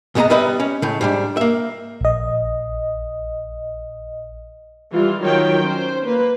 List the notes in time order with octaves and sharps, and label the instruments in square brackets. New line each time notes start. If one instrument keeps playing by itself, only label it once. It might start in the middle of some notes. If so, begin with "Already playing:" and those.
[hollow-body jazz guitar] C2 G#2 G#3 B3 D#5 A#5
G3 B3 B4 D#5 E5
C#4
A2 C#3
G#2 G3 D4
A#3 E5
[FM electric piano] A#1 D#5
[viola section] E3 G3 F4
D#3 F#3 F4 C#5 G5
C#4 C5
A#3 B4